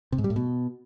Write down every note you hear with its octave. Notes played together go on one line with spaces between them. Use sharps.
C3
G#2
G3
A2
B2